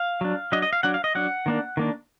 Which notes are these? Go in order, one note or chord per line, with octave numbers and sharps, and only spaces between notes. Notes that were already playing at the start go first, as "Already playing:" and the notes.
Already playing: F5
F#3 D4
F#3 D4 D#5
D#5
F5
F#3 D4 F#5
F5
D#5
F#3 D4 F#5
D#3 A#3 D4
D#3 A#3 D4